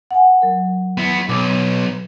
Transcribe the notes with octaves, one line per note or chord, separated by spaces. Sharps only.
F#5 G#5
F#3 A#4
B3 E4
B1 D6